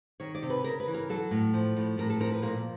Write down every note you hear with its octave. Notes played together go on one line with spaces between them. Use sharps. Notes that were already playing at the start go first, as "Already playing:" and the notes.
D#3 C#5
D5
C3
B4
C#3 A#4
B4
E3
A#4
F#3 A4
A2
F3
A2
A2 A#4
A4
F3 A#4
B4
A#2 A#4